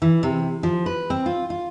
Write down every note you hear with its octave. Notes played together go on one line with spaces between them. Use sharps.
E3
C3
F3
B4
C4
F4
F4